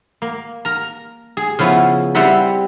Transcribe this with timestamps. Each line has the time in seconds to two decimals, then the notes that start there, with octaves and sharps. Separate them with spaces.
0.22 A#3
0.65 A#4 A#5
1.37 G#4
1.59 C#3 F3 B3 E4
2.15 G3 C4 E4 E5 F#5 B5